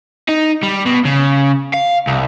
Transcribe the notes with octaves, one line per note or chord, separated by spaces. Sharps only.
D#4
G3
B2
C#3
F5
C2